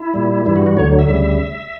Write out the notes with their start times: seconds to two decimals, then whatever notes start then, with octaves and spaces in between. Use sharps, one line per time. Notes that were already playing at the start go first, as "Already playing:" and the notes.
Already playing: E4
0.14 A#2 G3
0.45 G2 E3 G3 E4
0.56 F#4
0.66 F#4
0.77 D2 D3 F#3 C#5
0.99 E5
1.08 D2 C#3 G3